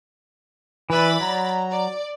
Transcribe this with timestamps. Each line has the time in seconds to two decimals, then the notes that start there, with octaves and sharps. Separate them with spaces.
0.90 E3 B4 D5 E5 B5 A6
1.20 F#3 A#5
1.71 D5